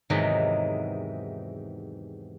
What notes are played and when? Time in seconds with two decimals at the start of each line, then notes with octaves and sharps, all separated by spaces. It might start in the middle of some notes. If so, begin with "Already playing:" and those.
0.10 E2 G#2 C3 D#3 E3 F#3